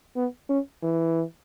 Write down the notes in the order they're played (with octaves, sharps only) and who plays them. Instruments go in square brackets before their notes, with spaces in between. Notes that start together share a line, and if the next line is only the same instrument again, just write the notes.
[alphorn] B3
C#4
E3